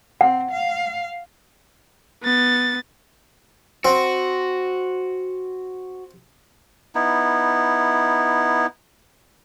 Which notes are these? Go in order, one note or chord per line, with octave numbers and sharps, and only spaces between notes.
C4 F#5
F5
B3 A6
C4 F#4
B3 D#4 E4